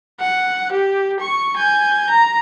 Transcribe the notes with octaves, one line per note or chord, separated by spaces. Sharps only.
F#5
G4
C#6
G#5 G6
A#5